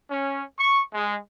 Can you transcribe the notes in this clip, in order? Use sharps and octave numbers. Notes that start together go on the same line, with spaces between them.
C#4
C#6
G#3